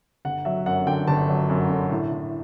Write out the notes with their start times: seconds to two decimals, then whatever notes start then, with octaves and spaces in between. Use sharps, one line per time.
0.25 G1 F#5
0.45 F#3 E5
0.66 F#2 F#5
0.87 D3 G5
1.07 G1 A5
1.29 F#3
1.50 F#2
1.70 D3
1.91 A2
2.12 A2